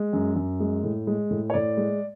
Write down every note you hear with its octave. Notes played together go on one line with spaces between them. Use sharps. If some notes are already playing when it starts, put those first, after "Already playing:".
Already playing: G#3
F#2
F#2
G#3
A2
G#3
A2
C#5
A2 D5
G#3